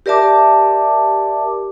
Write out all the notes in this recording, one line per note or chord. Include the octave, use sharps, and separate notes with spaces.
G4 A#4 D5 E5 A5 D6